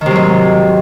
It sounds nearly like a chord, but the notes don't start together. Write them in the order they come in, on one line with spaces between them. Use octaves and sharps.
D#3 C3 F#3 G#2